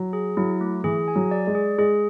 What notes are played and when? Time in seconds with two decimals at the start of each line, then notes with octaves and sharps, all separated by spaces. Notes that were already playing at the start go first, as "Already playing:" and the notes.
Already playing: F#3
0.13 G#4
0.37 F#3 E4
0.61 A3
0.84 E3 G#4
1.08 G#5
1.16 F#3
1.31 D5
1.47 G#3
1.55 G#4
1.78 G#3 G#4